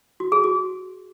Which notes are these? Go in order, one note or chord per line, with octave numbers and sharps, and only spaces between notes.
F#4
G#4
F#4